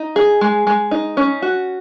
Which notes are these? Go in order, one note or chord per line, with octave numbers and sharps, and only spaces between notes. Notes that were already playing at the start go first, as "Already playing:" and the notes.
Already playing: D#4
G#4
G#3
G#3
D#4
C#4
F#4